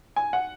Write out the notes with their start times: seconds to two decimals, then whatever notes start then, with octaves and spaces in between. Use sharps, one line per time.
0.16 G#5
0.33 F#5